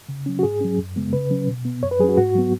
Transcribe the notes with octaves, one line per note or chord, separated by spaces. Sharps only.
C#3
F#3 C#4
F#4
G#2 G#4
F#3 C#4
F#2
C#3 G#3 B3
C#3 B4
F#3 C#4
B2
B3
F#2 C#5
B4
F#3 C#4 F#4 G#4
G#2 F#4
F#3 B3